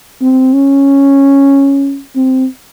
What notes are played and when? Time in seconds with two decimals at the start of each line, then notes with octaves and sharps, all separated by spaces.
0.21 C4
0.53 C#4
2.16 C4